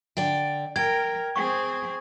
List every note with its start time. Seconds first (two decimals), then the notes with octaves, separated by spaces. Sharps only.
0.17 D3 D5 G5
0.76 A#4 G5 G#6
1.36 C4 G#4 C#6